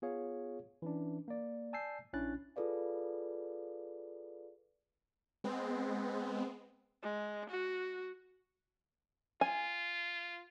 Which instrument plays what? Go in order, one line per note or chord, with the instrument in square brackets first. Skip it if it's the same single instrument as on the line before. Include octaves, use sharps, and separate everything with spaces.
[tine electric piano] B3 F4 G#4 C#5 F5
E3 C#4 D4
A#3 D5
D5 G#5 A5 E6 G6 C7
A#1 C#4 D4 E4 F#6 A6
[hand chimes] F4 G#4 A4 B4 D5 F5
[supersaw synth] G#3 B3 C4
[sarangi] G#3
F#4
[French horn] F4 [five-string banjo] G#5